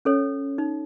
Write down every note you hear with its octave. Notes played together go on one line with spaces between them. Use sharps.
C#4 A4 C#5
D#4